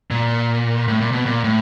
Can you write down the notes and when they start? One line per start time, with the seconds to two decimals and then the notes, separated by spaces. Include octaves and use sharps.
0.11 A#2
0.88 A2
1.00 A#2
1.12 B2
1.26 A#2
1.44 A2